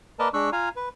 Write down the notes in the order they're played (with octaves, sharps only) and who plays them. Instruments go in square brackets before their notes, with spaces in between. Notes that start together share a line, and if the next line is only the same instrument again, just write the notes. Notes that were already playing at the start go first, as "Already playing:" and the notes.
[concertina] A#3 A#4 B4 D5 D#5 A5
G#3 D4 C#6 E6 F#6
F4 F5 G#5 A#5
B4